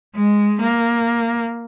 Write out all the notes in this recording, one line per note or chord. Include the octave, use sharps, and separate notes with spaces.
G#3
A#3